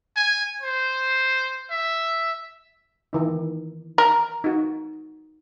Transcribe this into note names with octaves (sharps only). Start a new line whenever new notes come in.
G#5
C5
E5
D#3 E3 D#4
A#4
D#4 F#4